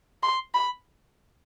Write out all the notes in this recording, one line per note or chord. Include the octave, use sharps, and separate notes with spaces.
C6
B5